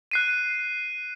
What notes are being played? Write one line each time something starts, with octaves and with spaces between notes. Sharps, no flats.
F#6 C7 D#7